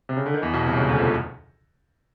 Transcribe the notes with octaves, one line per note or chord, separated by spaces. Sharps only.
C3
C#3
D3
D#3
E2 E3
B1 B2
C2 C3
C#2 C#3
D2 D3
F2 F3